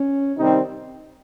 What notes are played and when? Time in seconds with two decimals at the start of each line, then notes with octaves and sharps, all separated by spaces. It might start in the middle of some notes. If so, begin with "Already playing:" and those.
Already playing: C#4
0.37 C3 D#3 G3 C4 D#4